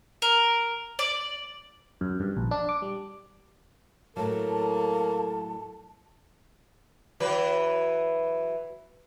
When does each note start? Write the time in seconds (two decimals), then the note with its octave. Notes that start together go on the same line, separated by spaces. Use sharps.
0.22 A#4
0.99 D5
2.01 F#2
2.20 G2
2.37 A#1
2.51 D4
2.69 D6
2.82 G3
4.17 A2 F#3 A#3 A4 A5
7.20 E3 F#3 B4